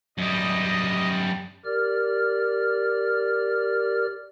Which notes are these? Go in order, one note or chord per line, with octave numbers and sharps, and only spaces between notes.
F#2 G3 D#5
G4 A#4 D5 F6